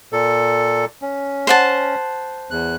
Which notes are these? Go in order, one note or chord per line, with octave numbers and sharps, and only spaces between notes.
A#2 A4
C#4
C5 F#5 A5
E2 F#6